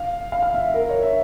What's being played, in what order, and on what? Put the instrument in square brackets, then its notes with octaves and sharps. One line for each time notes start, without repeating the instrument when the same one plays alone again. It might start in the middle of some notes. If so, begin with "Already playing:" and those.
Already playing: [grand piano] F5
F5
F5
E5
A#4
C#5
E5